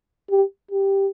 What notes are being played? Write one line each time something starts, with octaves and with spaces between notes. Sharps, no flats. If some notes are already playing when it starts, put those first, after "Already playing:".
G4
G4